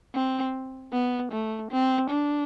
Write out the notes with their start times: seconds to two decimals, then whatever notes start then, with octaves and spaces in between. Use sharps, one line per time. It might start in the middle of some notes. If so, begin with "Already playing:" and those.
0.14 C4
0.93 B3
1.32 A3
1.71 C4
2.10 D4